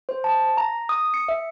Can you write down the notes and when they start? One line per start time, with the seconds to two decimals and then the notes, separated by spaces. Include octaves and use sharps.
0.09 C5
0.24 A5
0.57 A#5
0.89 D#6
1.14 C#7
1.28 E5